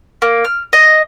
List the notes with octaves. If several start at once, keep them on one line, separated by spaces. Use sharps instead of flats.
A#3
F6
D#5